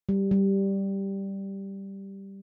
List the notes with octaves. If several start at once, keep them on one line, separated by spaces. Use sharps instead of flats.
G3
G3